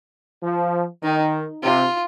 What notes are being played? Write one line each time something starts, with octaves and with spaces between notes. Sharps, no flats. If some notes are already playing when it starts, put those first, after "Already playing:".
F3
D#3 D#4
C3 F4